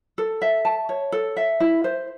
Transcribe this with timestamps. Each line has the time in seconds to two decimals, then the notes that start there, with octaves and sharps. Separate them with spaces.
0.18 A4
0.42 E5
0.65 A5
0.89 C#5
1.12 A4
1.36 E5
1.60 E4
1.84 C5